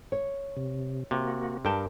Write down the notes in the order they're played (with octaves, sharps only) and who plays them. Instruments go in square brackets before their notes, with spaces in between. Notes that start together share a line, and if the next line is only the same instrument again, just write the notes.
[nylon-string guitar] C#5
[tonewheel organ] C3
[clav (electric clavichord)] C3 [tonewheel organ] A#3 F#4
[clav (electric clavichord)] G2 G5 [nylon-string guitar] A#4 A5